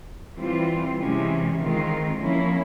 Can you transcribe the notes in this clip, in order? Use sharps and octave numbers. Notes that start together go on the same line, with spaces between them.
E3 G3 C4 F4
C3 E3 G#3 C#4
D#3 G#3 C4 F4
F3 A#3 C#4 E4